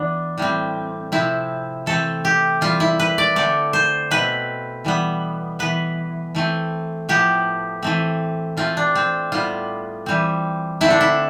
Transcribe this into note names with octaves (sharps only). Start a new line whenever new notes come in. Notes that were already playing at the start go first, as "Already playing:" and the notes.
Already playing: E3 B3 D4
A2 G3 C4
C3 F3 C4 E4
E3 A3 C4 A4
G4
E3 G3 C4 F4
E4
B4
D5
D3 A3 C4 D5
C5
B2 A3 C4 B4
E3 G3 B3
E3 B3 B4
E3 A3 C4
A2 F3 B3 G4
E3 A3 C4
E3 A3 C4 F4
D4
C4
A2 G3 B3 F4
E3 G3 C4
D3 A3 C4 E4
D4
E4